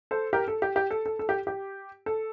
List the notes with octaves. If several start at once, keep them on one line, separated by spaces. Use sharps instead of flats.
A4 C5
G4 A#4
A4
G4
G4
A4
A4
A4
G4
G4
A4